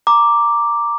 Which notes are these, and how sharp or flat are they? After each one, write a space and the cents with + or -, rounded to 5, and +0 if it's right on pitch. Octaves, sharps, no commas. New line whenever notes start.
A#5 +0 D6 +0